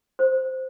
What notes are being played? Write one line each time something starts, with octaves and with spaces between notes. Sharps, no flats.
C5